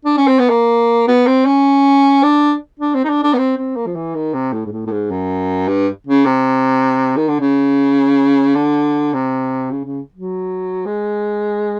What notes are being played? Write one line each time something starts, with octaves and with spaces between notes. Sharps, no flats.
D4
C#4
C4
B3
A#3
B3
C4
C#4
D4
D4
C4
D#4
D4
D4
B3
C4
C4
A#3
F3
E3
D#3
C3
A2
G#2
A2
A2
G#2
F#2
G2
C#3
C3
D#3
D3
C#3
D3
C3
C#3
C#3
F#3
G#3